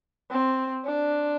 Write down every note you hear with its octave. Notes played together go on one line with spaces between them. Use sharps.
C4
D4